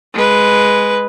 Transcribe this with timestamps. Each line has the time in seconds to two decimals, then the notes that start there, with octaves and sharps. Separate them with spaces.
0.14 G#3 B4